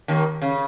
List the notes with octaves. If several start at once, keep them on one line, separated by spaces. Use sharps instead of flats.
D#2 D#3
C#3